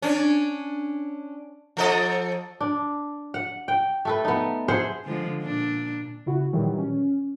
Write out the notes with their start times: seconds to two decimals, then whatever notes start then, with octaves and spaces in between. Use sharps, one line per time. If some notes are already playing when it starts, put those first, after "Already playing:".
0.02 C#4 D4
1.77 F3 A4 D#5
2.61 D4
3.34 F#5
3.68 G5
4.05 A3 A4 B4
4.25 B3 D#4
4.68 G#4 C5 E5 F#5
5.05 D3 F3 G#3
5.42 A#2 D4
6.26 C#3 E4 F#4
6.53 A#2 D#3 E3 F#3 G3
6.78 C#4